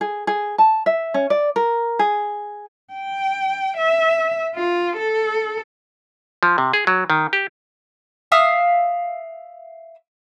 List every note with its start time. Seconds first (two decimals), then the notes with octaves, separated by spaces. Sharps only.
0.01 G#4
0.27 G#4
0.58 A5
0.86 E5
1.14 C#4
1.30 D5
1.56 A#4
1.99 G#4
2.93 G5
3.77 E5
4.55 F4
4.97 A4
6.43 F3
6.58 C3
6.73 G#4
6.87 F#3
7.10 D#3
7.33 G4
8.32 E5 F5 D#6